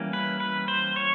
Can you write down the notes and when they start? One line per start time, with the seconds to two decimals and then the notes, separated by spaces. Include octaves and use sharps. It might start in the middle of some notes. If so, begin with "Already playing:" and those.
Already playing: E3 G3 A#3 C#4
0.13 B4
0.40 B4
0.68 C5
0.96 C#5